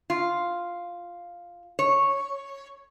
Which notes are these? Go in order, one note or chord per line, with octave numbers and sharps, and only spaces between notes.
F4
C#5